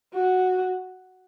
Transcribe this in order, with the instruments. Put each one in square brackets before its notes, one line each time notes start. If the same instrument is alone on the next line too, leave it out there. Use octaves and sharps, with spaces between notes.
[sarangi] F#4